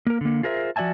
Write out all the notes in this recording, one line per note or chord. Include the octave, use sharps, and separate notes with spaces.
A#3 A#4
D3 A#3
F4 G#4 A#4 C5 E5
F3 F#4 D5 E5 G#5 A5